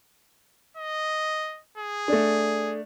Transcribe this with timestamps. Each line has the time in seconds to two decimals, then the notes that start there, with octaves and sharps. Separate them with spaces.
0.77 D#5
1.78 G#4
2.08 A3 D4